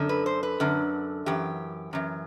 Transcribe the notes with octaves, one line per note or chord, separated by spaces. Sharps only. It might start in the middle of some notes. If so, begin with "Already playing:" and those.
Already playing: F#2 D3
B4
C5
B4
F#2 D3
F#2 E3 G4
F#2 E3